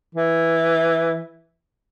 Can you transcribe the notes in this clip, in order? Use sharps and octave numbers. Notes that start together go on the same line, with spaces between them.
E3